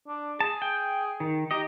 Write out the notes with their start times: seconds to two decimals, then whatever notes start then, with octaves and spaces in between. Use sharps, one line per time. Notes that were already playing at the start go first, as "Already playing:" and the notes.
0.08 D4
0.40 G#4 A5
0.62 G5
1.20 D#3
1.51 D#4 G4 D#5